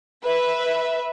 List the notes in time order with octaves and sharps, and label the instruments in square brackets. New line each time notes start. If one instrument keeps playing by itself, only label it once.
[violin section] B4 E5